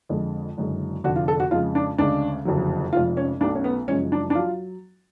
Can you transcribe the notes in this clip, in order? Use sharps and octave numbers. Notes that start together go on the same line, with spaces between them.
F2 D3 G#3
F#1 F#2 D3 G#3
F1 F2 D3 F#4
F4
A4
F#4
F2 C#3 G#3 F4
D4
D2 C#3 G#3 D4
F#1 F2 D3 F#3
F1 F2 F3 G#3 F4
C#4
B1 B2 A3 D4
C#4
B3
F#1 F#2 F3 G#3 C#4
D4
D4
F#3 F4